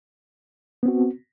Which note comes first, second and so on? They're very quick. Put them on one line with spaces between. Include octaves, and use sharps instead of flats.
B3 C4 F#4